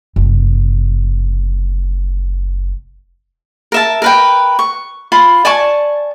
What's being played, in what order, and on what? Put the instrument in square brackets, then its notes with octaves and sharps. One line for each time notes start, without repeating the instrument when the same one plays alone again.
[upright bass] F#1 C3
[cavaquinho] A#4 E5 A5
A#4 B4 G5
C#6
F4 B5 C6
D5 G#5 A5 C#6